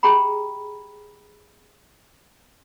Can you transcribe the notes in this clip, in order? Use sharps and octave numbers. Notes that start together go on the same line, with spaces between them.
G4 G#4 G5 A#5 B5